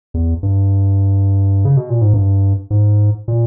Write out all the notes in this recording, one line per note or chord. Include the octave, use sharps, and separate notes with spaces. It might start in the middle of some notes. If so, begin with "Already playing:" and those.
E2
G2
C#3
B2
A#2
G#2
G2
G#2
A#2